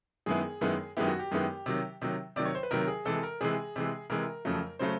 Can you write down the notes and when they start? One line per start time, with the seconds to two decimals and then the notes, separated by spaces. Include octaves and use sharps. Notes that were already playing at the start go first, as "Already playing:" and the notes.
0.26 F#2 D#3 G#3 B3 E4 G#4
0.61 F#2 D#3 G#3 B3 E4
0.97 F#2 D#3 G#3 B3 E4 G4
1.08 F#4
1.19 G4
1.31 F#2 D#3 G#3 B3 E4
1.66 C3 D#3 F#3
2.02 C3 D#3 F#3
2.36 C3 D#3 F#3 D5
2.45 C#5
2.55 C5
2.63 B4
2.71 C3 D#3 F#3 A#4
2.88 G#4
3.05 C3 E3 G#3 A4
3.23 A#4
3.41 C3 E3 G#3 G#4
3.76 C3 E3 G#3
4.10 C3 E3 G#3 A#4
4.45 F2 C#3 F#3 A3
4.79 C#3 F#3 A3 C5